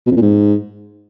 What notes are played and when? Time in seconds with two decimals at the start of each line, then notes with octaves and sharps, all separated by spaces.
0.06 B2
0.11 F2
0.16 A#2
0.22 G#2